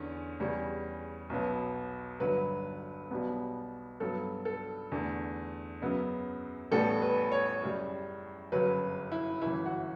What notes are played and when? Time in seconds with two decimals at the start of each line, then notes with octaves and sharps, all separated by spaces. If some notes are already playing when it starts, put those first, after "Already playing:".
Already playing: E2 D3 C#4
0.40 E2 C#3 G3 C#4
1.30 B1 B2 F#3 B3
2.20 G1 G2 D3 F#3 B4
3.11 B1 B2 G3 B3
4.00 G2 F#3 B3 A4
4.45 A4
4.92 E2 D3 A3
5.82 F#2 C#3 F#3 B3
6.71 A1 A2 G3 B3 A4
7.02 B4
7.32 C#5
7.62 F#2 C#3 G3
8.52 G1 F#2 C#3 F#3 B4
9.12 E4
9.42 G1 F#2 E3 E4
9.65 F#4